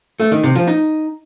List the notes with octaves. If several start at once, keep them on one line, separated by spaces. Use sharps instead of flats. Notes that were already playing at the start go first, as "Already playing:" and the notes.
A3
D#3
C3
F3
D#4